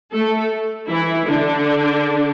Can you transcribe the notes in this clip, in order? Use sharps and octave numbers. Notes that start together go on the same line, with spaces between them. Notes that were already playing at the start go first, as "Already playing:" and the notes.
A3 A4
E3 E4
D3 D4